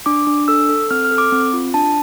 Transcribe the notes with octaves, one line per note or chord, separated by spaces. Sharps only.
D4 D6
D4
A4 E6
A4
C4 F6
F6
A4
D6
C4
F4
D4 A5